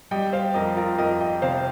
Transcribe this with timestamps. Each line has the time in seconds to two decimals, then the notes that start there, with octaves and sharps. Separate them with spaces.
0.11 G3 D#5 G5
0.33 C5 F5
0.54 F2 A#4 D#5
0.77 F4 A#4
0.98 F2 A#4 D#5
1.20 D#5 G5
1.42 C3 C5 F5